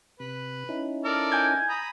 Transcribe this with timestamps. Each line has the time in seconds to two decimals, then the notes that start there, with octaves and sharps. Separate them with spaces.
0.20 C3 B4
0.69 C#4 D#4 E4
1.05 A4 A#4 D5
1.32 G#5 G6 G#6
1.69 A#5 B5 D#6